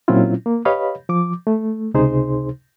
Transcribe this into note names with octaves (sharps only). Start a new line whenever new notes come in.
A#2 F#3 C4 C#4 E4 F4
A#3
G4 B4 C#5 D#5 F5 B5
F3 D6
A3
C#2 C3 D#4 G#4 C5 C6